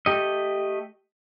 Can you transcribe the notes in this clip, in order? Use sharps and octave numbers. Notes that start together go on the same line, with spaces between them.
A3 G4 D#5